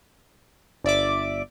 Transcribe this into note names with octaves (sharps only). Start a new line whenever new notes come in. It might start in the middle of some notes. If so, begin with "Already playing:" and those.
G1 D5 E5 D6